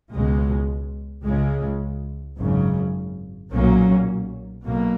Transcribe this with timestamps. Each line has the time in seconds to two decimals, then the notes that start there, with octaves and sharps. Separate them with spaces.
0.11 C#2 B2 G#3
1.24 C#2 C#3 G#3
2.38 G#1 F#2 C#3
3.51 B1 A#2 F#3 A#3 C#4
4.65 B1 B2 A#3